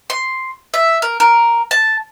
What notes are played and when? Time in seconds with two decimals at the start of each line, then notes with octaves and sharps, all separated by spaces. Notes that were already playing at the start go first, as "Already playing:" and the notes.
0.10 C6
0.74 E5
1.02 A#4
1.20 A#4
1.71 A5